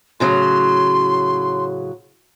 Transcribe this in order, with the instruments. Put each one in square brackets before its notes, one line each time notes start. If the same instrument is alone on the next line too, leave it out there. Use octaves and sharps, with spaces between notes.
[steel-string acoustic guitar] A2 C#3 F#3 [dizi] C6